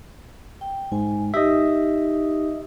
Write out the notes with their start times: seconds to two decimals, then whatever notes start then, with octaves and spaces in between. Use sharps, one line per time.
0.61 G5
0.92 G#2 G#5
1.34 D#4 G4 D#5 E5